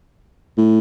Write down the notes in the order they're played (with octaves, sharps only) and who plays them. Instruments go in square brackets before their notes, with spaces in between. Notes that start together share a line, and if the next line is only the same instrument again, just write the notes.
[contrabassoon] A2